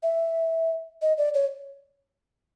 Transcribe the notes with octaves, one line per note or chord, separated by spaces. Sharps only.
E5
D#5
D5
C#5